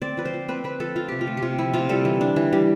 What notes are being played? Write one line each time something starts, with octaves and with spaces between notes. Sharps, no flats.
C4 D5
F3 B4
C5
F3
C4 B4
C4 B4
F3 A4
F3 F4
C3 G4
F4
A3
G4
C3 F4
F3 E4
C3 F4
G3 A4
E3
D4
E3
G3